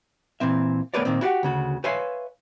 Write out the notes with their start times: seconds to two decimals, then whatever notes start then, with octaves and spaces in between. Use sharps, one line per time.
0.40 A#2 E3 C4 E5
0.94 A3 B3 A#4 B4 C#5 D5
1.05 A#2 D#3 A#3 C4
1.21 E4 F#4 G4 F#5
1.43 D2 C#3 F#4
1.84 B4 C#5 E5 F5 G#5 C6